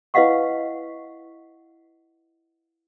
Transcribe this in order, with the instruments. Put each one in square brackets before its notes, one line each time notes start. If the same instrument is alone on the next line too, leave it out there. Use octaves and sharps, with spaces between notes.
[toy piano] E4 B4 D#5 F5 F#5 C#6